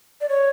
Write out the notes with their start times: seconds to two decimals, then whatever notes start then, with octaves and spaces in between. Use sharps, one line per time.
0.21 D5
0.29 C#5